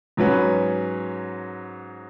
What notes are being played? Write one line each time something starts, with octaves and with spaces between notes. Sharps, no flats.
G#2 F#3 C#4 F#4 B4